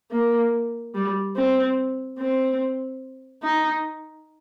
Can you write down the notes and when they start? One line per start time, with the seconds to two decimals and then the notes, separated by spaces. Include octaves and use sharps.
0.11 A#3
0.95 G3
1.36 C4
2.19 C4
3.43 D#4